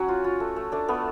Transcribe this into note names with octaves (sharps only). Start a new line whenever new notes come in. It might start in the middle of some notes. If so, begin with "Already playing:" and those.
Already playing: F#3 C#4 F#4 F#5
F4
F4
A3
A3
A3 D4 D5
A3 B3 B4